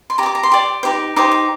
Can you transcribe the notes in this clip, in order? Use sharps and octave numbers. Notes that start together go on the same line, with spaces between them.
C6
G4 D5 A#5
D6
A#5
C6
G4 D5
D#4 G4 C5
D#4 G4 C5 D6
D6